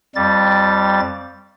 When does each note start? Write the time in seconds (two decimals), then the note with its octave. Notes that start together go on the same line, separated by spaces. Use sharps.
0.15 F2 G3 A6